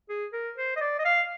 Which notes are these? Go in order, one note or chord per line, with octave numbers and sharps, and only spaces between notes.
G#4
A#4
C5
D#5
D5
D#5
F5